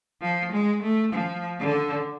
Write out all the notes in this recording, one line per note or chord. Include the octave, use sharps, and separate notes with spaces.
F3
G#3
A3
F3
D3